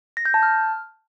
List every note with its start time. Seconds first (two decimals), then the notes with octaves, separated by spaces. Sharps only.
0.17 A#6
0.25 G6
0.34 A5
0.43 F6